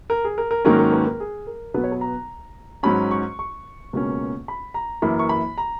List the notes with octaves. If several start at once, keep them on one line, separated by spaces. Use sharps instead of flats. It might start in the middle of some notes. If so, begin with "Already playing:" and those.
A#4
G#4
A#4
A#4
G#2 D#3 F#3 A#3 C#4 A#4
A#4
B4
A#4
G#4
A#4
B2 F#3 B3 B4
C#5
B4
A#5
G#2 F#3 C#4 B5
C#6
C#6
C#2 B2 A#3 C#4
B5
A#5
F#2 E3 A#3 B5
C#6
B5
A#5